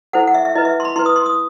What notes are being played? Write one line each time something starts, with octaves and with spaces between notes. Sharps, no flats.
E4 A4 C5 F#5
F#5
E5
E5
E4 B4 D#5
E5
C6
B5
E4 B4 C6
D#6
C6
D#6